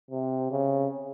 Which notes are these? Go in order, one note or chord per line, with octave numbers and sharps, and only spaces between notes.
C3
C#3